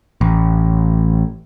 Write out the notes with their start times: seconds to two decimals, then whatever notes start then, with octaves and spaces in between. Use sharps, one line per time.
0.21 A1